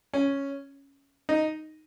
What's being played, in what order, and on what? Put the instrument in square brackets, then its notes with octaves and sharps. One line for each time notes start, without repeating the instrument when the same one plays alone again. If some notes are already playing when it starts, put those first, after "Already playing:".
[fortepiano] C#4
D#4